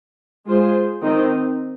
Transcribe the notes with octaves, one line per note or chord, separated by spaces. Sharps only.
G#3 F4 G#4 C5
D#3 C4 D#4